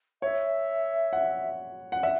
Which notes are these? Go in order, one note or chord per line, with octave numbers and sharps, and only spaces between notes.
C#5 E5
F#5
F#5
E5 F#5